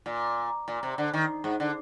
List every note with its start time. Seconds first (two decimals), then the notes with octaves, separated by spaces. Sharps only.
0.06 A#2
0.68 A#2
0.83 C3
0.98 D3
1.13 D#3
1.44 G#2
1.60 D3